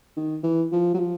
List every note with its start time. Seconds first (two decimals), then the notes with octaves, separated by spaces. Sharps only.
0.16 D#3
0.43 E3
0.72 F3
0.94 F#3
0.99 F3